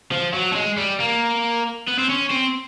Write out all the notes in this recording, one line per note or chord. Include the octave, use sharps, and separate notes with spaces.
F3
F#3
A3
G#3
G3
A#3
B3
C4
C#4
C4